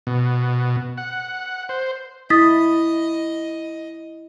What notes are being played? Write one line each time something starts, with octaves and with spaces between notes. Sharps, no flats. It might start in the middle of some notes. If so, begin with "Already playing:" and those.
B2
F#5
C5
E4 D#5 D#6 A6 B6